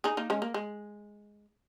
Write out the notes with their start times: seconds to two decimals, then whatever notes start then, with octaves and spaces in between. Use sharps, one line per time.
0.04 D#4 G#4
0.17 A#3 D#4
0.30 G#3 C#4
0.42 A#3
0.54 G#3